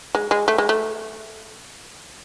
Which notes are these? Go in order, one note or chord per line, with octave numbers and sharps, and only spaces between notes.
G#3
G#3
A3
G#3
A3